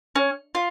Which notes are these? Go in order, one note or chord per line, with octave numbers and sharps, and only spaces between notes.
C#4
F4